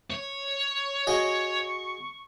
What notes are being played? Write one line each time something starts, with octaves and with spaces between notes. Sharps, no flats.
C#5
F#4 G#4 D#5 C#6